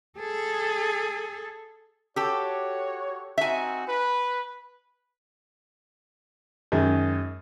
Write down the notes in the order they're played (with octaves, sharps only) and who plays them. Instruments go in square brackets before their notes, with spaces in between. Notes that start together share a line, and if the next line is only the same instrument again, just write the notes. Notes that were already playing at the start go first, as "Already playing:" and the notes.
[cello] G#4 A4
[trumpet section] F#4 C#5 [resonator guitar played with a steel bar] G4 A4
[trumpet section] C4 D#4 F#4 [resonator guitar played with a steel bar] E5 G#5
[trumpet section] B4
[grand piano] F#2 [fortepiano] D#3 G#3